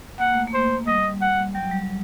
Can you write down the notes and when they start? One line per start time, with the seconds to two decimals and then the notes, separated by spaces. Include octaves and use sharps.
0.19 A#3 F#5
0.33 A3
0.47 A#3
0.54 C5
0.87 G3 D#5
1.21 F#5
1.54 F#3 G5
1.71 G3